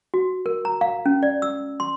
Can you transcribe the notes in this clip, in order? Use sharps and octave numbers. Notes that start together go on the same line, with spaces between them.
F#4
A#4
A#5
F5
C#4
D5
E6
C6